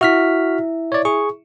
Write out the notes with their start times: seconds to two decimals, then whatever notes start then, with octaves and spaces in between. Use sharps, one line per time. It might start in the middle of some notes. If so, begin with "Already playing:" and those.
0.01 E4 F#4 E5 F6 B6
0.92 C#5 D5
1.05 G#4 C#6